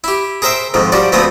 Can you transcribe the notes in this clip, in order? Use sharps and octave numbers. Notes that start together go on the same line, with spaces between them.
E4 G4
G#4 A#4 C5 E5 G5
F2 G#2 D#3 F3
F3 G3 F#4 D5
D2 F3 A3 B3 C4 D#6